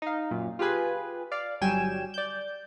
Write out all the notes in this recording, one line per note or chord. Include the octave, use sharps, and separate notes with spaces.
D#4 F5
F#2 A#2
F4 G4 G#4 B4 G#5
D5 F5
G1 F#3 G3 G5 G#5 E7
D5 G6